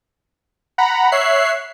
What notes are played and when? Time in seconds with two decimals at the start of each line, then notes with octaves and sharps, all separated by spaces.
0.78 F#5 A#5 B5
1.12 C#5 E5 F#6 C7